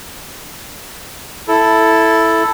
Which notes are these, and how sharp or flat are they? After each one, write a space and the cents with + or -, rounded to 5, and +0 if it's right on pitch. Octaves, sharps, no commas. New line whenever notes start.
E4 +0 A4 +0